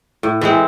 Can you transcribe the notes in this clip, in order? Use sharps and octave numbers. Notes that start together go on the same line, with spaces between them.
A2
E3 G#3 C4